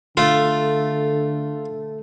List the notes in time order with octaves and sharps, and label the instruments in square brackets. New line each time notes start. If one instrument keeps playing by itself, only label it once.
[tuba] D3 [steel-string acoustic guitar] A3 [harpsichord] F4